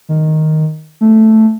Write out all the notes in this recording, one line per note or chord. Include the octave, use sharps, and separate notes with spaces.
D#3
A3